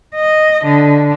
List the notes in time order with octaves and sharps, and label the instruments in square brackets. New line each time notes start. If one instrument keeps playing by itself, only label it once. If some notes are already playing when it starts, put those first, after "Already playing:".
[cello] D#5
D3